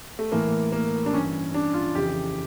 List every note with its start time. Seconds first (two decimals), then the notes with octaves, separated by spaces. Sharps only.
0.19 A3
0.32 A2 E3 A#3
0.72 A#3
1.06 D4
1.14 E3 C#4
1.17 G2
1.54 D4
1.74 F4
1.95 F2 C#3 E3 G4